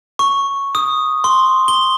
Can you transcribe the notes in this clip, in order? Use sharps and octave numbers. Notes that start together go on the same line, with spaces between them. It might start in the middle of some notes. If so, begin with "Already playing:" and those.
C#6
D#6
C6
G7